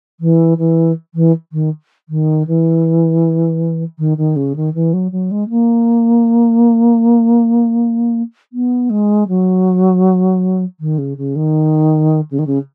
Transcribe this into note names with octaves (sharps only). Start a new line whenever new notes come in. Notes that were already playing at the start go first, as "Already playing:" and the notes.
E3
E3
E3
D#3
D#3
E3
D#3
D#3
C#3
D#3
E3
F#3
F#3
G#3
A#3
B3
G#3
F#3
D#3
C#3
C#3
D#3
C#3
D#3
C#3